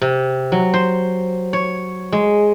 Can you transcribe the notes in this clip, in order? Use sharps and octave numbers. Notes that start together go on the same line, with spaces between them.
C3
F#3
C5
C#5
G#3